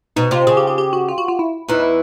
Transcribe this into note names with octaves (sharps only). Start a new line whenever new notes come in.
B2 D#4
C3 F4
C#3 G#4
G4
G4
G4
F#4
F4
F#4
F4
E4
E2 E3 D#4
E4